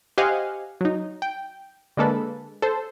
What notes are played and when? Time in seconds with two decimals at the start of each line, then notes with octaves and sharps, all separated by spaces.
0.18 G4 C5 D#5 F5 F#5 G#5
0.81 F#3 D#4
1.22 G5
1.97 D3 G#3 A#3 A4 B4
2.62 A4 C5